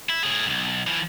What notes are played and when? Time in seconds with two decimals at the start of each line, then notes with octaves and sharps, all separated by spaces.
0.09 E4
0.24 A2 G#4
0.46 B1 F2
0.87 E3 F3